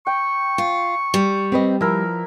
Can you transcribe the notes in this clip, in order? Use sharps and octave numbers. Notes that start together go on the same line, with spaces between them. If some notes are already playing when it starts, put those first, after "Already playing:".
G5 C#6
F4
G3
C4 B4 D#5
F3 E4 A#4